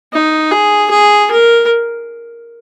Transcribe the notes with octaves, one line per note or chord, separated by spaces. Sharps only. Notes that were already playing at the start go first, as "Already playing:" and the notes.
D#4
G#4
G#4
A#4